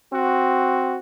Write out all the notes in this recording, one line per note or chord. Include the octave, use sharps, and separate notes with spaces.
C4 F#4